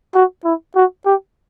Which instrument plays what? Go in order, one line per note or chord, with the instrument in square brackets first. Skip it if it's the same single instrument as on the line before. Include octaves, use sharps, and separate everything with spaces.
[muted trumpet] F#4
E4
F#4
G4